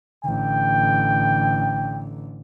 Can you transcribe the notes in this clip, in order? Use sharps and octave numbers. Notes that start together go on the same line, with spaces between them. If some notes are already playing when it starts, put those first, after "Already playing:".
A1 D3 G5